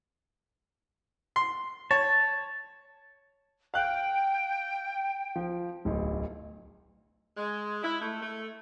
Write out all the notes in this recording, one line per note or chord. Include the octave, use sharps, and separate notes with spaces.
C6
C#5 A5
F5 G5 F#6
F3
D1 B1
G#3
E4
A3
A3